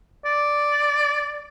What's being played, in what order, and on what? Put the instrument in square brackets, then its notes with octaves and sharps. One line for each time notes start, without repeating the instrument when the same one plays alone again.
[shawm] D5